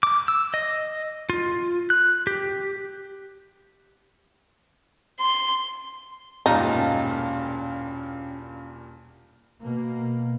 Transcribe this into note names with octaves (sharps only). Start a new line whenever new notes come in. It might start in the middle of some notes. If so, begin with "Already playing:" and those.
D6
E6
D#5
F4
F#6
G4
C6
E1 G2 A#2 C#4 D#4 F5 G5 A5
B2 A#3